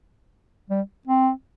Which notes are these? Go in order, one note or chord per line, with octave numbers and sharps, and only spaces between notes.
G3
C4